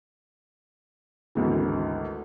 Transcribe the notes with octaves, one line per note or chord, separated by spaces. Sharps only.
G#1 D2 E3